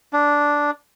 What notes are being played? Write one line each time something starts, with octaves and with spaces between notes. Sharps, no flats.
D4